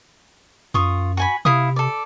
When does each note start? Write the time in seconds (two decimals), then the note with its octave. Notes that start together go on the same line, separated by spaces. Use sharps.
0.74 F#2 F4 C#6 D#6
1.17 F#4 G#5 B5
1.45 C3 E4 F5 D#6
1.76 A4 D5